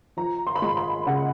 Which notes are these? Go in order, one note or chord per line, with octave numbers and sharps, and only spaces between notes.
F3 A#5
C6
B5
G#3 C6
B5
C#3 F#5